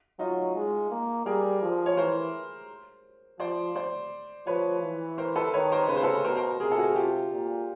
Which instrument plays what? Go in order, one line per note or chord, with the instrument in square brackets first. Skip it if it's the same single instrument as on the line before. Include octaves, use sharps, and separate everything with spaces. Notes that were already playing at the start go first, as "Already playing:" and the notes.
[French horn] F#3 [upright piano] D#4 F4
[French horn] G#3
A#3
[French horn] G3 [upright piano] G#4 A#4
[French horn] F3
[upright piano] C#5
[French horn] E3 [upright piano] A#4 C5
[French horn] F3 [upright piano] C5 D5
[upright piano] C5 D5
[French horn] F3 [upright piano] B4 C#5
[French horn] E3
[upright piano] A#4 C5
A4 B4
[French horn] D#3 [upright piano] B4 C#5
[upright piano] A#4 C5
[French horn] C#3 [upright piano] B4
[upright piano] C5
A4 B4
[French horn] B2 [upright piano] A#4 C5
[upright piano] A#4 C5
[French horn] C3 [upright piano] G#4 A#4
[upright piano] A4
F#4 G#4
F4 G4
[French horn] A#2